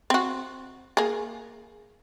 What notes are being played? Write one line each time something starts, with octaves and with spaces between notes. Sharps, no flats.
C4 F#4
A#3 G#4